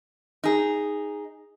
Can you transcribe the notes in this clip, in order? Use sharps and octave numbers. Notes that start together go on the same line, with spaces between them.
D#4 G#4